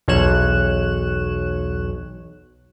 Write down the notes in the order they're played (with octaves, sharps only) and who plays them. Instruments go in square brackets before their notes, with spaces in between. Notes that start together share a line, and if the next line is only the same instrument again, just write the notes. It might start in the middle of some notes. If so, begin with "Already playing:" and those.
[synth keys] B1 E2 C#5 F#6 E7